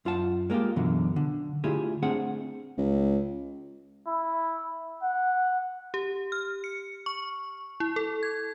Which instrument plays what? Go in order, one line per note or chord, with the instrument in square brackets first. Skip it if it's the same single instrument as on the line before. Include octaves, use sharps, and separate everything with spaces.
[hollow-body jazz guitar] F#2 F4 F#5 A5
G#3 A#3 D4 F4 G4
F#2 B2 D3 E3 F#3
D3
D3 A3 E4 F4 G4 G#4
A3 C4 D4 G#4 F#5
[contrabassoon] C#2
[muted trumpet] E4
F#5
[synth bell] G4
F6
C#7
C#6
E4
A4
G#6